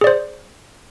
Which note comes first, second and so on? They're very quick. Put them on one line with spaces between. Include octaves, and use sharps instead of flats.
G#4 D5 C5